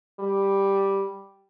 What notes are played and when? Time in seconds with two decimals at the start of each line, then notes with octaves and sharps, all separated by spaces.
0.20 G3